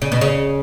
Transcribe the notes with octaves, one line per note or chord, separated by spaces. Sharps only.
C#3
B2
C#3